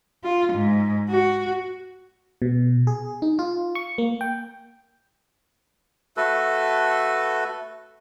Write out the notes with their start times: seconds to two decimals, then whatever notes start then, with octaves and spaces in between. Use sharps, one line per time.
0.24 F4
0.54 G#2
1.10 F#4
2.42 B2
2.87 G#4
3.22 D#4
3.39 F4
3.75 C#6
3.98 A#3
4.21 G5
6.17 A3 F#4 A4 B4